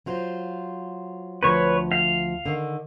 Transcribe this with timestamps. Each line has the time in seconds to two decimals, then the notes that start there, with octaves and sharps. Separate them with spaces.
0.06 F#3 F4 C5
1.43 D2 F3 B4 C#5
1.92 F5
2.46 D3 D#3